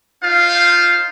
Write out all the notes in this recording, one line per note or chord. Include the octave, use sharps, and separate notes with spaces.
D#4 F4 C5 F5